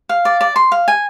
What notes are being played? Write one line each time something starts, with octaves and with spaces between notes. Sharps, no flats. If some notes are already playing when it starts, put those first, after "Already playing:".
F5
D5
D5
C6
F5
G#5